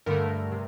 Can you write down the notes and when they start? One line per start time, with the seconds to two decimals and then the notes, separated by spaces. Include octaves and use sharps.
0.06 G2 D3 A3 A#4
0.52 C3